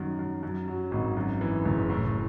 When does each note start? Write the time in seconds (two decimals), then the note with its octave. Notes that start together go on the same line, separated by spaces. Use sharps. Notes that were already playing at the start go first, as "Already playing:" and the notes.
Already playing: F#2 D#3
0.19 F#2
0.43 F#2
0.68 F#3
0.91 G#1
1.17 F#2
1.41 E3
1.65 F#1
1.90 A2